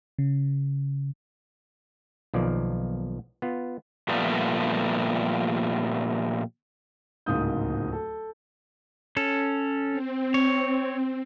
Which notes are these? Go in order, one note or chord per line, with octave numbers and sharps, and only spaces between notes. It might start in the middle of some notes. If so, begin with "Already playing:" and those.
C#3
B1 D#3 F3 A#3 D5
B3 F4
A#2 F3 G3 A3 B3
D1 C#2 G#2 A#3 D#6 G6
A4
C#4 A4
C4
C#5